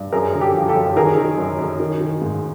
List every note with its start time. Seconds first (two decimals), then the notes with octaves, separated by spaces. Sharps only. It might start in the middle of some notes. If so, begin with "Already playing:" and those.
Already playing: G2
0.12 F#2 G#4 A#4
0.34 D3
0.40 G4 A4
0.54 F3
0.68 G4 A4
0.76 F#2
0.96 D#3 G#4 A#4
1.18 D#3
1.38 F#2
1.59 F#2
1.80 D#3
2.01 D#3
2.22 G#2